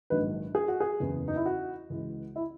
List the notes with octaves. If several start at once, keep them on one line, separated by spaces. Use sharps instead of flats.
A#1 G#2 D#3 F#3 B4
G#4
F#4
G#4
F#1 E2 C#3
D#4
E4
F#4
C#2 C#3 E3 G#3
E4